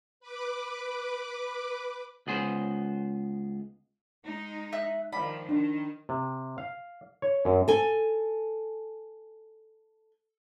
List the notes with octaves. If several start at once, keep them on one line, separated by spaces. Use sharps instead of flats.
B4 D6
C#2 B3 G#4 C5
G#3 D#4
E5 F#6
D#3 F3 D5 F5 B5
D#3 D4
C3
F5
C#5
F#2
A4 G#5